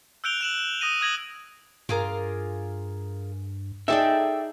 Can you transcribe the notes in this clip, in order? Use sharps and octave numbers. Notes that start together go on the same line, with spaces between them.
E6 F#6 G6 D7 F7 G7
F#6 E7 F#7
D#6 A#6 D#7
D#6 G#6 A#6 F#7
G2 F4 G#4 A#4 D6
D#4 G#4 A4 D5 E5 G5 D6